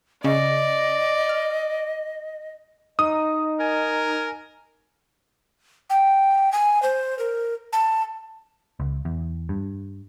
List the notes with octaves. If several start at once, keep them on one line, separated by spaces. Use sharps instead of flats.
C#3 C#4 D5 D#5
F6
D#4 D#5 D#6
A#4 G#5
G5
G#5
C5
A#4
A5
C#2
E2
G2